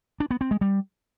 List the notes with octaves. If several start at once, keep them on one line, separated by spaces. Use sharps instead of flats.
D4
B3
C4
G#3
G3